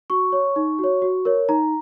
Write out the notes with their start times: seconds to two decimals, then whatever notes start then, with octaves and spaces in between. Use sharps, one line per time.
0.10 F#4 C#6
0.32 C#5
0.56 D#4
0.79 F#4 C#5
1.02 F#4
1.25 A#4 C#5
1.49 D#4 A#5